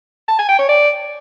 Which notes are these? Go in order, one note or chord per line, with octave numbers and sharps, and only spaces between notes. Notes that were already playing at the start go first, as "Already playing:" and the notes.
A5
G#5
G5
C#5
D5